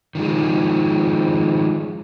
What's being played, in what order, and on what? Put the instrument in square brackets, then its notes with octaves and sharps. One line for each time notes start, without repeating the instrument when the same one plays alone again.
[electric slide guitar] D#3 F3 G#3